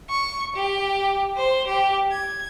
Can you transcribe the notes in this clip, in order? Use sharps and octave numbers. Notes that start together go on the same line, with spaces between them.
C#6
G4
C5
G4
G#6